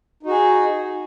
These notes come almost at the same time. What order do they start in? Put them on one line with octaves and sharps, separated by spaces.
D#4 F#4 G#4